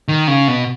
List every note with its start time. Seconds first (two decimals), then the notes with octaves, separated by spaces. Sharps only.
0.08 D#3
0.28 C#3
0.48 B2